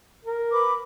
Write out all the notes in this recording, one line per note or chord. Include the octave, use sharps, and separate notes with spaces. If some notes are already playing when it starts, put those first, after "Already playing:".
A#4
B4 B5 D6